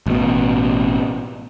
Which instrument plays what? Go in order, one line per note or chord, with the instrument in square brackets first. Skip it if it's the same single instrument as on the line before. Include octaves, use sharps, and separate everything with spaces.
[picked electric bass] A1 B2